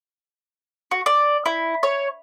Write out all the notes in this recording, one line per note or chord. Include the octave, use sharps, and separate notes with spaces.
F#4
D5
E4
C#5